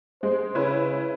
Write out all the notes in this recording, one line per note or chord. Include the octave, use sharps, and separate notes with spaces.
G#3 C5
C#3 C#4 E4 B4